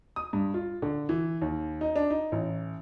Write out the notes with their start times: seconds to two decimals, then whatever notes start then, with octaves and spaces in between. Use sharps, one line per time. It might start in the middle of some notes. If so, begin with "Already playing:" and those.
0.16 D#6
0.33 G2
0.54 F4
0.82 D3
1.09 E3
1.42 D#2
1.81 D#4
1.96 D4
2.10 D#4
2.32 A1